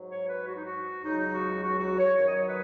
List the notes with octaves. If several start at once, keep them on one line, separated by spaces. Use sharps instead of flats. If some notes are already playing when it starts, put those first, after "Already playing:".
Already playing: G#2 F#3
C#5
B4
F#4
D#4
F#4
C#2 C#3 F#3 D#4
F#4
F#4
F#4
C#5
F#2 D#3 F#3 C#5
D#5
C#5
B4